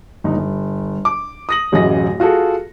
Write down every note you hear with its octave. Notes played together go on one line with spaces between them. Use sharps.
G1 D#4
G1
D6
D#6 A#6 F#7
D1 A1 F#2 G#4 D#5 A#6
F4 F#4 G#4 A4